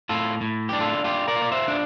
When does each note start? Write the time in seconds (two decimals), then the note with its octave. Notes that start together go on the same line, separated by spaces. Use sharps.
0.09 A2 F4 A4
0.41 A2
0.69 D4 G4
0.81 F4 A4
1.04 F4 G4
1.28 A#4 D5
1.36 F4
1.42 D5
1.52 C5 E5
1.68 D4